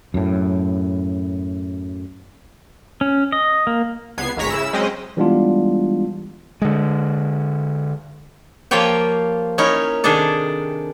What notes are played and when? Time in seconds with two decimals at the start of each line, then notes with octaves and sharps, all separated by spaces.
0.14 F#2 A2
3.01 C#4
3.32 D#5
3.67 A#3
4.18 C#2 B3 G#6 C7
4.37 G#1 D2 G#3 C#5 A#5 B6
4.50 C#3 E4 E6
4.73 F#3 G#3 C4 C#4 D#5
5.17 E3 G3 G#3 B3 D4 F4
6.62 D3 G#3
8.71 F3 A#3 F4 G4 C#5 G5
9.58 C#4 D#4 E4 A#4 C#5
10.04 C3 D#3 D4 G#4 A4 D5